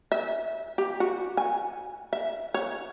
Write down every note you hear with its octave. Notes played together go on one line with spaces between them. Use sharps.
E5
G4
F#4
G#5
E5
C#5